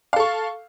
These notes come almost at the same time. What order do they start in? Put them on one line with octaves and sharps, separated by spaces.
F5 A4 C#6